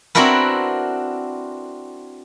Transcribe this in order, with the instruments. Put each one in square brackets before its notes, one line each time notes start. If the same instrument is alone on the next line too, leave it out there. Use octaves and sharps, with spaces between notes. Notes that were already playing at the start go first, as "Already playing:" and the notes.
[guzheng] C4 D4 E4 F#4 A#4 B4